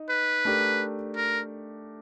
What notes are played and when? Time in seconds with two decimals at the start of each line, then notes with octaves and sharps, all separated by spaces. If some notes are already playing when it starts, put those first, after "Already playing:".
Already playing: D#4 D#5
0.10 B4
0.45 A3 D4 G4 A#4
1.16 A#4